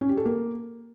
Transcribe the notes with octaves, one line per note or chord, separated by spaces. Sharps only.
C#4
G4
A4
A#3